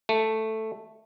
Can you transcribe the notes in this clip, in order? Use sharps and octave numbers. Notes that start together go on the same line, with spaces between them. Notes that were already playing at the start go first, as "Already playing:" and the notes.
A3